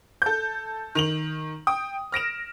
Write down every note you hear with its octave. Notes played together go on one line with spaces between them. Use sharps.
A4 G6
D#3 F7 F#7
G5 D#6
F6 A#6 D7 E7